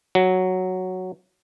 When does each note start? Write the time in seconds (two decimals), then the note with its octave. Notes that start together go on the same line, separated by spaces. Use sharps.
0.15 F#3